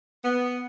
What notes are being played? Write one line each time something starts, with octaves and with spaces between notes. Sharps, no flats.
B3